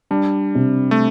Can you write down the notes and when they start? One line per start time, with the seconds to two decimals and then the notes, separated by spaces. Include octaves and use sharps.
0.11 G3 D4
0.55 C3
0.91 A3